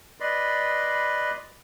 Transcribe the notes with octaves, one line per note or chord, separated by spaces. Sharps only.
B4 D5 D#5 B5 C6